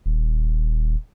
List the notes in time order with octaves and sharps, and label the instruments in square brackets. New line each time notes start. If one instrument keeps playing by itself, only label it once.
[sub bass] D#1